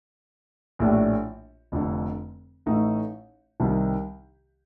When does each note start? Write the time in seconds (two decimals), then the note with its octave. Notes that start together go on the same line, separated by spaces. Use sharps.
0.79 A#1 A2 A3 D4 G4
1.72 F1 F2 D3
2.66 A1 A2 A3 D#4
3.60 C2 C3 D#3 G3